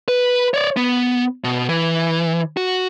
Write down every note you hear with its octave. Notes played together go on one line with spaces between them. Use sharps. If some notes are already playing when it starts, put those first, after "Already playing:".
B4
C#5 D5
B3
B2
E3
F#4